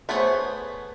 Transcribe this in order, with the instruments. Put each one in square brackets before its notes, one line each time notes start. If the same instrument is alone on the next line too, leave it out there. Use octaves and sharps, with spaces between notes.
[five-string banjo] A3 B3 G#4 C5 C#5